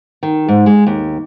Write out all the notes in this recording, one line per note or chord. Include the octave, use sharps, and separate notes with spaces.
D#3
G#2
G#3
D#2